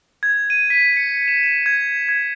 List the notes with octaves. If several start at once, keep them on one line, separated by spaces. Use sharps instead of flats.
G#6
D#7
B6
C#7
E7
E7
G#6
G#6